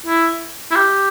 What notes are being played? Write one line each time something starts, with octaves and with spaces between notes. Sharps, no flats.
E4
E4
G4